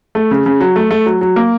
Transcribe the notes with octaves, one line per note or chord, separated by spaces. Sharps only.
A3
C#3
C#3
F#3
A3
A3
F#3
F#3
A#3